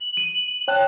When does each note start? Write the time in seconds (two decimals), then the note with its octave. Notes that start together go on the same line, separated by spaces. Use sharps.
0.01 F#7
0.17 D#7
0.68 C#5 G5 A5 F#6